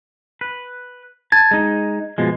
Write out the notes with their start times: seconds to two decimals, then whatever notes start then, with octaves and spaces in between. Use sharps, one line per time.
0.41 B4
1.32 A5 G#6
1.51 G#3 D#4
2.18 B2 F3 G#3